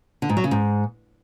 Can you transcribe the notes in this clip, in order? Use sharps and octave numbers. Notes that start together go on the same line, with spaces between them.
D3
G#2
F#3
C#3
G#2